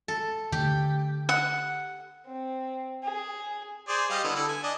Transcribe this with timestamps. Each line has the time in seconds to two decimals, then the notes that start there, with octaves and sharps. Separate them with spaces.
0.08 A4
0.52 D3 A3 G4
1.29 F#5
2.26 C4
3.04 G#4
3.88 G#4 C5 D5
4.10 G3 D#5 F5
4.24 D3 B3 E4
4.36 D3 E4 A4
4.49 G#5
4.63 D4 D#5